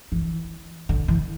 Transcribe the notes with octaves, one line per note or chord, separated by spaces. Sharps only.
E3
D3
E3